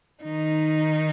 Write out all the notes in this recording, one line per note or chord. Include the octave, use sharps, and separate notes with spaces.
D#3 D#4